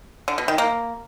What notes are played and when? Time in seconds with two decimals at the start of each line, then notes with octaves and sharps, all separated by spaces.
0.28 D3
0.38 B2
0.48 D#3
0.58 A#3